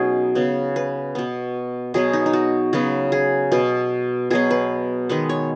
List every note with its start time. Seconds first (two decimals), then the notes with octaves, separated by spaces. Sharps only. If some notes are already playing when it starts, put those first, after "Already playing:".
Already playing: B2 F#3 B3 C#4 D#4 G#4
0.35 C#3 B3
0.76 B4
1.15 B2 B3
1.94 B2 F#3 B3 G#4
2.13 D#4
2.26 D#4
2.33 F#4
2.73 C#3 F#3 B3
3.12 G#4
3.52 B2 B3
4.30 B2 F#3 B3 G#4
4.51 B4
5.09 D#3 G#3 B3 B4
5.29 C#5